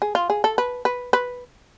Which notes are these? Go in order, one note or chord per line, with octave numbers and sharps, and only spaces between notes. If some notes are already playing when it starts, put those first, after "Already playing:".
G#4
F4
G#4
A4
B4
B4
B4